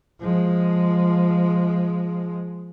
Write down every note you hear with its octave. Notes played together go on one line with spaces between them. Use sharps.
F3 G#3